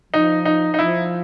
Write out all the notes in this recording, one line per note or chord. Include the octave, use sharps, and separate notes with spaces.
F3 D#4
D#4
D#4
F3 E4